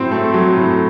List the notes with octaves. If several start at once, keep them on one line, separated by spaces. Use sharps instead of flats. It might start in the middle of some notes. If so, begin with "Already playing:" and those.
Already playing: A2 F#3 C4
A3
F#3
A2